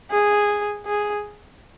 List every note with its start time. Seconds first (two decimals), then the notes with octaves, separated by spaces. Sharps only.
0.11 G#4
0.86 G#4